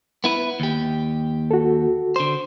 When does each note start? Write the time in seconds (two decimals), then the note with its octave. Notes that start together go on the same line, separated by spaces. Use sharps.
0.24 B3 E4 B4
0.60 D#2 G4
1.51 F#4 A4
2.16 D3 C5